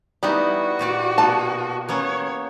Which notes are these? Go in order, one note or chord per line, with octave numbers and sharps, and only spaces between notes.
G3 B3 D#4 E4 F#4
A#2 G4 D5
B2 A#3 B3 A5
A#3 B3 C#4 C#5